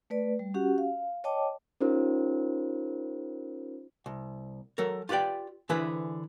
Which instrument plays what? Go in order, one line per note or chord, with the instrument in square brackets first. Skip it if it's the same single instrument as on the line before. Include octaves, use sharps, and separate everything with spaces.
[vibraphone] A3 B4 D5
G3
C#4 F#4 G4 F#5
F5
C#5 D#5 G5 A5 D6
[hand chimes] C#4 D#4 F4 G4 A#4 C5
[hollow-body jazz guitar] C2
F#3 A4 A#4
F4 G4 B4 D5 G5
D3 E3 E4 G#4 B4 C5